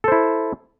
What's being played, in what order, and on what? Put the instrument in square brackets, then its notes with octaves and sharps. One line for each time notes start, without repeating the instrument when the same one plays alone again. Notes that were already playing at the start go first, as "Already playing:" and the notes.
[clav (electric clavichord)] A4
C5
E4